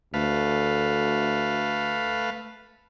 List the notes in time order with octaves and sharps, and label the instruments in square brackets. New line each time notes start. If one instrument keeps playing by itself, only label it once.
[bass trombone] D2 [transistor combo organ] A3 B4 F5